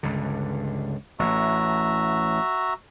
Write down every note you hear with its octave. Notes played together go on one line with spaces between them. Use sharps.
C#2 G2 D3
A1 A2 F#4 E5 A#5